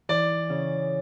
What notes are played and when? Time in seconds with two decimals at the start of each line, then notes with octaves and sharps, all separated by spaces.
0.09 E3 D5
0.49 C#3